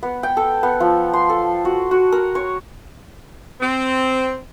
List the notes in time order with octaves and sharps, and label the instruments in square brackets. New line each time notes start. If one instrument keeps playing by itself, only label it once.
[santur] B3
G5
A4
B3
F3
C6
A4
F#4
F#4
A#4
C#5
[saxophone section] C4